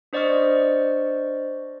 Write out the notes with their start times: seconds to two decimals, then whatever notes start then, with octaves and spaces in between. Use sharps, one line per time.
0.13 D4 C5 D5 D#5 C#6 F6